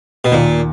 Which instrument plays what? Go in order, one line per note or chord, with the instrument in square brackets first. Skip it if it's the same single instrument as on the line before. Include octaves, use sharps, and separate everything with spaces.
[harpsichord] B2
[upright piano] D#2 [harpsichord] A#2